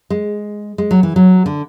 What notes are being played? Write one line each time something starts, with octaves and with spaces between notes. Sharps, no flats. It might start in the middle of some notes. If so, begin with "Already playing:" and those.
G#3
G#3
F#3
E3
F#3
D3